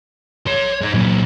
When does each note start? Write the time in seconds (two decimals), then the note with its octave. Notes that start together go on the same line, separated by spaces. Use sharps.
0.47 C#5 C6
0.82 G#3 D#4
0.94 A#2 F#3